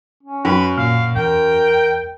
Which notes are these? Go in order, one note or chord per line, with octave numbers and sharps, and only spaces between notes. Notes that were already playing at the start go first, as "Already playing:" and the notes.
C#4
F#2 B4
A#2 F5 F6
E2 A#4 G5